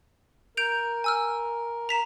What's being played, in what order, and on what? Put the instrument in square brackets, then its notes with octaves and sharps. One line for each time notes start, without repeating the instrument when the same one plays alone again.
[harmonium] A#4 [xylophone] G6 D7 F7
[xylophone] G#5 E6 F6
A#5 B6 E7